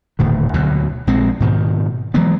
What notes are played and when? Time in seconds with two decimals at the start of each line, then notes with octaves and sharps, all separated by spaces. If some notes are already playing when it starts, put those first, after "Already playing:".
0.19 D#1 A2 D3
0.54 D2 B2 F#3
1.07 A#1 G#3 C4
1.40 G#2 B2 D#3
2.14 E3 F#3 G#3 B3